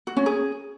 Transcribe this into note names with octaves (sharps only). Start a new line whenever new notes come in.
F#4
C#4
G#4